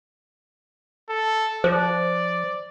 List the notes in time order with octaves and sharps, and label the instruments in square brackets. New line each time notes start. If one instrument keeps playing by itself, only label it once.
[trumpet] A4
[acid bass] F3 [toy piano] C5 [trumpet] D5